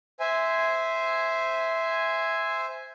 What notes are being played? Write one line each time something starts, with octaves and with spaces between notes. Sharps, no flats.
C5 E5 G#5